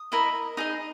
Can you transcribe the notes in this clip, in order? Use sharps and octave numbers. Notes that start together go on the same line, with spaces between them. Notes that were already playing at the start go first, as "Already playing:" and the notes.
Already playing: D#6
E4 A#4 D#5
D#4 G#4 D#5